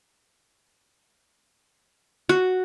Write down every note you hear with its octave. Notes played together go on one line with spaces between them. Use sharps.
F#4